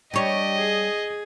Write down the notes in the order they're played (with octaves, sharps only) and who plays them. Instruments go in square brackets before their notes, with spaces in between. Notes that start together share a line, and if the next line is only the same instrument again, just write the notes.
[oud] G3 C#5 [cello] D4 G4 [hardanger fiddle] D#5
[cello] G#4